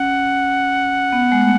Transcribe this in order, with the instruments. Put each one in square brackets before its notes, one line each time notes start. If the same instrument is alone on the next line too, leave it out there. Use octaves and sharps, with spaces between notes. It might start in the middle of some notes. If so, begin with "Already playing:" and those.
Already playing: [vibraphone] C#4 [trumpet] F#5
[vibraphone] B3
G#3
A3